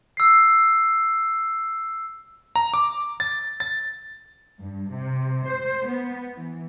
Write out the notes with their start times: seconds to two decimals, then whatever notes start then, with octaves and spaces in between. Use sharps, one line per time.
0.17 E6 C7
2.56 A#5
2.74 D6
3.20 A6
3.60 A6
4.61 G2
4.92 C3
5.48 C5
5.87 B3
6.35 E3